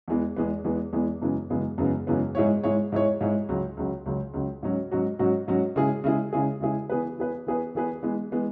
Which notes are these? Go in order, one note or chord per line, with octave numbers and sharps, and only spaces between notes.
E2 E3 G#3 B3
E2 E3 G#3 B3
E2 E3 G#3 B3
E2 E3 G#3 B3
F#2 C#3 E3 G#3 B3
F#2 C#3 E3 G#3 B3
F#2 C#3 E3 G#3 B3
F#2 C#3 E3 G#3 B3
G#2 G#3 E4 C#5
G#2 G#3 E4 C#5
G#2 G#3 E4 C#5
G#2 G#3 E4 C#5
C#2 C#3 F#3
C#2 C#3 F#3
C#2 C#3 F#3
C#2 C#3 F#3
G#2 F#3 C#4 F#4
G#2 F#3 C#4 F#4
G#2 F#3 C#4 F#4
G#2 F#3 C#4 F#4
C#3 G#3 E4 G#4
C#3 G#3 E4 G#4
C#3 G#3 E4 G#4
C#3 G#3 E4 G#4
E3 B3 G#4 B4
E3 B3 G#4 B4
E3 B3 G#4 B4
E3 B3 G#4 B4
E3 G#3 B3
E3 G#3 B3